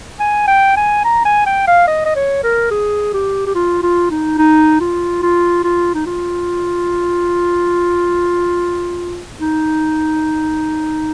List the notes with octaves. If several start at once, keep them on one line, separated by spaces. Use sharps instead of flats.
G#5
G5
G#5
A#5
G#5
G5
F5
D#5
D#5
C#5
A#4
G#4
G4
G4
F4
F4
D#4
D#4
F4
F4
F4
D#4
F4
D#4